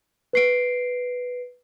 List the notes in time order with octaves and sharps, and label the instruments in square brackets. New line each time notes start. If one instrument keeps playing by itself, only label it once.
[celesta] B4 C7 D7